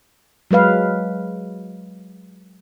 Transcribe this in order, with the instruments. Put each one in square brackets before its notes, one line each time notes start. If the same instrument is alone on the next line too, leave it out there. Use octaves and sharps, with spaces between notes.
[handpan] F#3 G#3 B4 F5